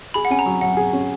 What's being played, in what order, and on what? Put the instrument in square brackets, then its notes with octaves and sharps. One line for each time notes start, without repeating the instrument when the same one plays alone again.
[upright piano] G#4 [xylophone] B5
[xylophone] F#5
[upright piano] C#4 [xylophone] G#5
[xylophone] A#5
[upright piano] F#3
[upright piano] F#3 [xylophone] F#5
[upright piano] G#4
C#4